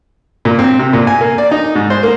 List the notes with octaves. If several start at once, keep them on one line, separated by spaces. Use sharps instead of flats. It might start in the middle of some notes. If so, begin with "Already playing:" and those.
A#2
C4
C3
A#2
G#5
A#3
D5
D#4
G#2
C5
A#3